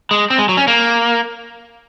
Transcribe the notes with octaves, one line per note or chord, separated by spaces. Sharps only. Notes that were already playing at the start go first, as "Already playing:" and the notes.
G#3
C4
G#3
F#3
C#4
A#3